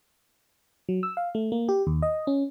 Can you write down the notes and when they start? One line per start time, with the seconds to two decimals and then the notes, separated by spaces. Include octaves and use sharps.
0.89 F#3
1.03 E6
1.17 F5
1.35 A3
1.52 A#3
1.69 G4
1.87 D#2
2.02 D#5
2.27 C#4